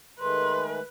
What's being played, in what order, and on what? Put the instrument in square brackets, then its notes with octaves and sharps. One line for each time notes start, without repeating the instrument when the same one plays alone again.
[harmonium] D#3 G#3 A3 [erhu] B4 [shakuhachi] C6